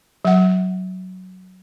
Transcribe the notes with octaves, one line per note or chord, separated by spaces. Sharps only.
F#3 F#5